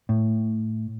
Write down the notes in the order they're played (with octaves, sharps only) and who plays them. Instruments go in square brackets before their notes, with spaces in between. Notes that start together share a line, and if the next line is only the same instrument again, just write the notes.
[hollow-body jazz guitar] A2